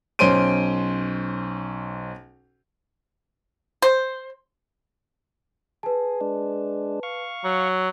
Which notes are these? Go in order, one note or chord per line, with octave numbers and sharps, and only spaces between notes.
B1 C#4 C5 C6 D7 D#7
C5
G#4 B4 A5
G#3 D4
F5 C#6
F#3